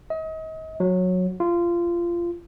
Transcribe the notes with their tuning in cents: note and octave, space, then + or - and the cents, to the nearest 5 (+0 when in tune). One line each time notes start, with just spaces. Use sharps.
D#5 +35
F#3 -15
F4 -20